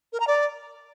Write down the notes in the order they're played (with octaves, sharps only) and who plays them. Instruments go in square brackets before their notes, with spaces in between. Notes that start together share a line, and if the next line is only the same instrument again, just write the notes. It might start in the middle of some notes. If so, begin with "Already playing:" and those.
[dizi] A#4
A#5
D5